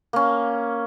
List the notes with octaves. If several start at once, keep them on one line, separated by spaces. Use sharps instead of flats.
A#3 C#4